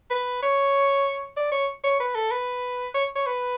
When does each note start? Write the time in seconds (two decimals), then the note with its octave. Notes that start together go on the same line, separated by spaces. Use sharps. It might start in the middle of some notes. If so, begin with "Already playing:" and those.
0.10 B4
0.43 C#5
1.37 D5
1.52 C#5
1.84 C#5
2.00 B4
2.15 A4
2.31 B4
2.94 C#5
3.16 C#5
3.26 B4